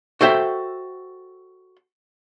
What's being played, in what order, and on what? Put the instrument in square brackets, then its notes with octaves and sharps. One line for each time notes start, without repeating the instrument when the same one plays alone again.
[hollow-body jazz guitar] F#4 A4 C5 E5 G5